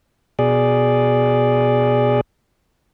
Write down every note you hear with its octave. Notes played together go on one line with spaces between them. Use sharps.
B2 G#4 D5